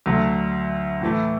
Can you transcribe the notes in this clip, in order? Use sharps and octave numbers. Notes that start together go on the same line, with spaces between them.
D2 D3 F#3 A3
A2 E3 A3 E4